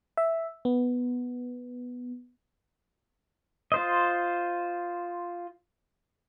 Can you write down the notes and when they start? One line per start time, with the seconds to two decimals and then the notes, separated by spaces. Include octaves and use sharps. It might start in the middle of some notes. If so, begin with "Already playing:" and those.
0.17 E5
0.65 B3
3.72 F4 C5 D#5